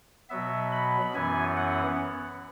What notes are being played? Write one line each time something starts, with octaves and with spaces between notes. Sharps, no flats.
B2 F#3 B3 E5
B5
F#2 E3 B3 G#5
F#5